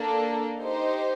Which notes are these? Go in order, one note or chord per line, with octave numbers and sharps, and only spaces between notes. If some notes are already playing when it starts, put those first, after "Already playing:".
Already playing: A#3 D4 A4
D#4 G4 C5